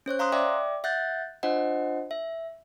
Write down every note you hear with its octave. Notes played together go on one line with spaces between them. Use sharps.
C#4 C5 C#5 F#6
F5 A#5 C6 D#6 F#6
D5 E5 G5 D6
E5 F#5 F#6 G6 A6
D4 F4 C5 D#5 F#5
E5